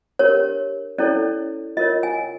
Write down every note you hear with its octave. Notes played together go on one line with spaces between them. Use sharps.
D4 G4 A#4 C#5
C#4 E4 A4 C#5 D5
F4 A#4 C#5 D#5
G#5